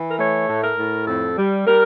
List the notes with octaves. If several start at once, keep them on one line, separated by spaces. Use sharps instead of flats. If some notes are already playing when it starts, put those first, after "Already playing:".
Already playing: E3
A#4
A3 C#5
A2
A#4
A2
F2 A4
G3
G3 A#4